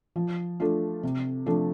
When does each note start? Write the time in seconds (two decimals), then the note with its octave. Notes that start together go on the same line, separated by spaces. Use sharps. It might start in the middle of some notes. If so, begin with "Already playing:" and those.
0.16 F3
0.60 A3 D4 F4
1.03 C3
1.46 F3 A3 D4